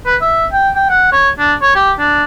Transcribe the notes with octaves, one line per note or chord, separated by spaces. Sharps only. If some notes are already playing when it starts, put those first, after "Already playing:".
B4
E5
G5
G5
F#5
C#5
D4
C#5
G4
D4